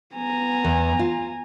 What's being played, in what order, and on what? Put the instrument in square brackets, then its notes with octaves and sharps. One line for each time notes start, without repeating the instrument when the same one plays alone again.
[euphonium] B3 [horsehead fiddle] G#5 A#5
[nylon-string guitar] E2
F4